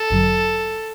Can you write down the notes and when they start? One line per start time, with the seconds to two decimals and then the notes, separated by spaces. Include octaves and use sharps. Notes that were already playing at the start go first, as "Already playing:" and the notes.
Already playing: A4
0.10 G1 F#2 D3 F#3